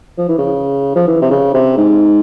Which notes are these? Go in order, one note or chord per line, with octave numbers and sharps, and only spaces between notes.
F3
E3
C#3
F3
E3
C3
C#3
C3
G#2